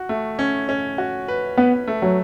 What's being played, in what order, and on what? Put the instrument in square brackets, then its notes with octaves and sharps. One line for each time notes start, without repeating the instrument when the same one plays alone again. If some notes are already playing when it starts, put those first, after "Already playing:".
Already playing: [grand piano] F#4
A3
C#4
C#4
F#4
B4
[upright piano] B3 [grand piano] B4
[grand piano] A3
[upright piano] F#3